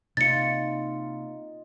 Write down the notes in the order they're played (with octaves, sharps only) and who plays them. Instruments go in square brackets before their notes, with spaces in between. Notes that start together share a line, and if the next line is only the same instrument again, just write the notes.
[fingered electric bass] C3 A#3 [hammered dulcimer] D#4 F4 [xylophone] A6 C#7